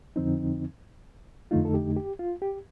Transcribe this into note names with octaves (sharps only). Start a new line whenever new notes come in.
F2 D3 F3 C4 D#4
F2 D3 A3 D#4 F4
A4
G4
G4
F4
G4